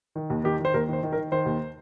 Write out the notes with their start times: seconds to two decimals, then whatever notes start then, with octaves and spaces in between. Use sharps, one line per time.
0.15 D#3
0.30 D#2
0.44 D#3 G4
0.59 D#3
0.65 C5
0.74 D#2 A#4
0.88 D#3 C5
1.03 D#3
1.12 A#4
1.17 D#3
1.32 D#3 C5
1.46 D#2